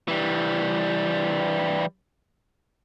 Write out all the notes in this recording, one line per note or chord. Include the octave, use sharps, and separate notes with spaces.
E3 G3